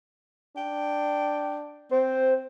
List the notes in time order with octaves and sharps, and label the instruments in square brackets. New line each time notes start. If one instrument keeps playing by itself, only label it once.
[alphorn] D4 [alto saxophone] G5
[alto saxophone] C4 [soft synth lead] C5